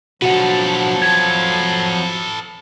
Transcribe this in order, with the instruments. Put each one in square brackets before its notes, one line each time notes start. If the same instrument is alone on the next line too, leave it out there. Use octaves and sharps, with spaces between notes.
[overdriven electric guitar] B2 D4 [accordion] F3 F#3 [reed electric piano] F#4 F#5 [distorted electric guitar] A4 B4
[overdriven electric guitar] F2 F4 [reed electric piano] G#6